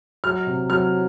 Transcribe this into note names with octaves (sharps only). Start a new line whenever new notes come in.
F#3 F6
C3
F#3 F6